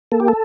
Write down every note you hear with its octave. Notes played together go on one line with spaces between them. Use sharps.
A#3 A4
G4
A4